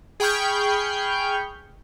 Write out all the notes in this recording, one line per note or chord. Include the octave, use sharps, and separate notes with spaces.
G#4 G5 B5 C#6 F6 G6